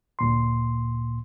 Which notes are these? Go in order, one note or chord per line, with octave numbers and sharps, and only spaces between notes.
D2 A#2 C6